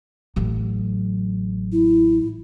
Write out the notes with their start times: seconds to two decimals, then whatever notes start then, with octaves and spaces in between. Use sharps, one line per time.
0.36 A1 F#3
1.72 E4